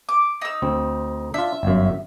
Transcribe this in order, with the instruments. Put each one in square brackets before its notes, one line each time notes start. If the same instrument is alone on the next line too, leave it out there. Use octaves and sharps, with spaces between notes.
[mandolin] D6
D#4 E6
[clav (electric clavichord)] D2 C4
[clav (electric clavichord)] D4 F4 [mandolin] E5
[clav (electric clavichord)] G1 F#2